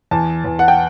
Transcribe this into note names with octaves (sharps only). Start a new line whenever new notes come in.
E2 A5
E2
F#5
G5